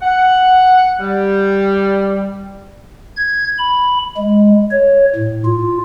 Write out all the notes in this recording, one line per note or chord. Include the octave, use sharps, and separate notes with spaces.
F#5
G3
G#6
B5
G#3
C#5
A2
F4